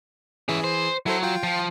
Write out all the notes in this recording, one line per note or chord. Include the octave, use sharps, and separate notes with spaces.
E3 C#4 G#4 E5
C5
F#3 E4 A4 C5
F4 G5
F3